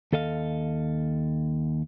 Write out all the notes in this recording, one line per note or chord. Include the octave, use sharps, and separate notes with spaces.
D#2 A4 D#5 F5